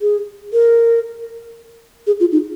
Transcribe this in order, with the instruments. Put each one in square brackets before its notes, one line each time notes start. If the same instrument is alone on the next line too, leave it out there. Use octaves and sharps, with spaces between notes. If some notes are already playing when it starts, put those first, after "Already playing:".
[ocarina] G#4
A#4
G#4
F4
D#4